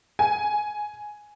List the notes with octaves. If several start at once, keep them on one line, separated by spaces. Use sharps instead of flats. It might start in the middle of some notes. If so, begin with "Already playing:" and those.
G#5